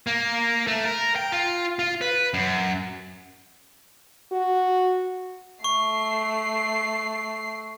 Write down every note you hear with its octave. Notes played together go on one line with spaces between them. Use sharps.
A#3
A3
A#4
G5
F4
F4
B4
F#2
F#4
A3 C#6 C7